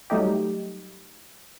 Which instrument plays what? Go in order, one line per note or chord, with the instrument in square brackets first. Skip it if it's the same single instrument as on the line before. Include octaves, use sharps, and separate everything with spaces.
[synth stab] F#3 G3 A3 D#4 G4